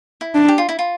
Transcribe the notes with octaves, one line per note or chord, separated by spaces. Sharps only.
E4
D4
G4
F4
E4
F4